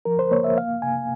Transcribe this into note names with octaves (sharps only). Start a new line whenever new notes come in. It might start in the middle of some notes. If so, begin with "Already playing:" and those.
F3 A#4
C5
A#3 C#5
E5
A#3 F5
C3 G#5